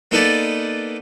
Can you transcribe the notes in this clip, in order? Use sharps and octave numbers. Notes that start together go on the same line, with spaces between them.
A#3 B3 D#4 A4 B4 D5